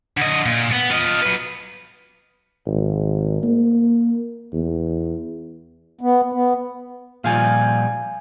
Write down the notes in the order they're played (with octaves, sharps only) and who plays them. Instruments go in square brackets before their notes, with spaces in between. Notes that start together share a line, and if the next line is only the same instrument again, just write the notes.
[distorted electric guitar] D3 D#5
A#2
B3
F4 D#5
F#3 B4
[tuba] G#1
A#3
E2
[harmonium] B3
B3
[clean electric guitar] A#2 F3 G3 [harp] F5 G#5